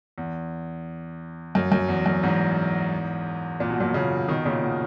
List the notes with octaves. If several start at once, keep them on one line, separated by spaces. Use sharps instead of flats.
E2
F#2
F#2
E2
F#2
E2 G#2
A#2
B2
F#2 A#2
A#2 C#3
B2 D#3
A#2 C#3
B2